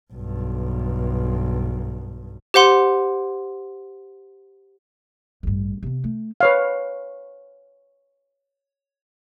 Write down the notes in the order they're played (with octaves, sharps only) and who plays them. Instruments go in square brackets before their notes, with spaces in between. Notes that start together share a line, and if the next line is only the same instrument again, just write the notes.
[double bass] B1 G2
[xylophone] G4 C5 F#5 C6
[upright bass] A1 G2
C3 B3
A3
[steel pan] B4 C#5 F5